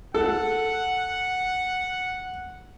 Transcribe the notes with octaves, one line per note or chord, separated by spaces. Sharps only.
A4 F#5